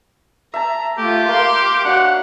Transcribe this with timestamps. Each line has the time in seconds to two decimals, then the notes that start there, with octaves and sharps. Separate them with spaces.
0.54 E5 A5 A#5
0.98 A3 F4 G4
1.28 A#3 F5 C6
1.84 D4 F#4 C#5 F5 F#5